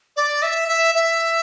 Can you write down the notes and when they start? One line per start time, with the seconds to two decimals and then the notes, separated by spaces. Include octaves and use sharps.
0.16 D5
0.43 E5
0.68 E5
0.95 E5